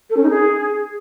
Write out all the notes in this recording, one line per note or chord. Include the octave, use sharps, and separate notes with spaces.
A4
C#4
D#4
G#4